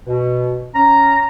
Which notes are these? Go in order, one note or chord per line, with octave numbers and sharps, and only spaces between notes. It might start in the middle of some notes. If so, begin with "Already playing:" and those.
B2
C#4 A#5